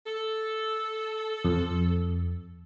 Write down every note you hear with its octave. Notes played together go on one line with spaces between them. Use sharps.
A4
F2